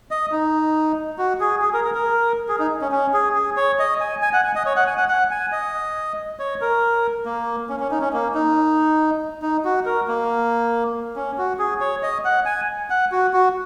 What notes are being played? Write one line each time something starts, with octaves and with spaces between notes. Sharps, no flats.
D#5
D#4
F#4
G#4
G#4
A#4
A#4
A#4
G#4
D#4
C#4
C#4
G#4
G#4
C#5
D#5
G#5
G#5
F#5
G#5
D#5
C#5
F#5
G#5
F#5
F#5
G#5
D#5
C#5
A#4
A#3
C#4
C#4
D#4
C#4
A#3
D#4
D#4
F#4
A#4
A#3
C#4
F#4
G#4
C#5
D#5
F#5
G#5
F#5
F#4
F#4